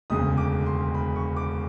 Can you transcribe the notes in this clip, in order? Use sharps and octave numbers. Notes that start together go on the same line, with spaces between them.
E1 D2 C#3 D#6
D6
C6
B5
C#6
D6